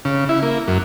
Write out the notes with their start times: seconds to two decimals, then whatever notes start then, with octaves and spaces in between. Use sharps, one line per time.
0.05 C#3
0.29 E4
0.43 A#3
0.68 F#2